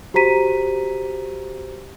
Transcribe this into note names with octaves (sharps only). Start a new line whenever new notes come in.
F#4 G4 C5 A#5 B6 D#7